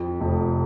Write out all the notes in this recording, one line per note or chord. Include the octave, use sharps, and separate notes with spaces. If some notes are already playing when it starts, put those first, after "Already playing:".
Already playing: F2
F1